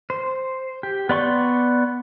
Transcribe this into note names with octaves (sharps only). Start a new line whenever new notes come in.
C5
G4
B3 D5 C6 C#6